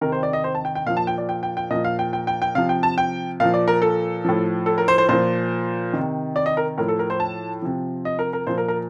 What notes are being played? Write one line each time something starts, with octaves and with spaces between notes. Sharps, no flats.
C3 D#3 A#4
C5
D5
D#5
C5
A5
G5
G5
A#2 F3 F5
A5
G5
D5
G5
G5
G5
A#2 F3 D#5
F5
G5
G5
G5
G5
C3 F3 F5
G5
A5
G5
A#2 F3 F5
D5
A#4
A4
A2 F3
A4
A#4
C5
C5
A#2 F3 C5
C3 D#3
D5
D#5
A#4
A2 F3 A#4
A4
A#4
C5
A5
C3 F3
D#5
A#4
A#4
A#2 F3 C5
A#4
A#4